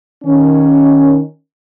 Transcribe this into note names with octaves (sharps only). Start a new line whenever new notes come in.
D#3 C#4